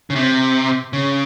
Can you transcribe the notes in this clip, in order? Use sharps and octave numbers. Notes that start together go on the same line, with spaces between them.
C#3
C3
C#3